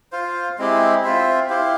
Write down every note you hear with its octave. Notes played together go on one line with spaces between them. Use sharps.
F4 C5 F5
G#3 C4 E4 G4
C4 F4 C5 E5
E4 G4 C5 F5